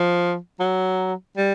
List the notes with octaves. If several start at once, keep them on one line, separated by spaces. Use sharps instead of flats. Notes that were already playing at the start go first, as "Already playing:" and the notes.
Already playing: F3
F#3
G3